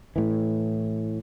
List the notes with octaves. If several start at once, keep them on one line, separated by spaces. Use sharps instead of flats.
A2 E3